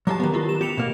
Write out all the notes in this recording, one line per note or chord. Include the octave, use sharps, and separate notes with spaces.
F#3 G4 A5 A#5 D6
D#3 B3
E4 F4 G4
E7
F4 G4 C#7 F7
B2 A#3